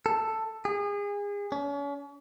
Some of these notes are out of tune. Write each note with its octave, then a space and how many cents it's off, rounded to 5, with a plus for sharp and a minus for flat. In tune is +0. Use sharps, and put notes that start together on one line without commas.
A4 +5
G#4 -30
C#4 +40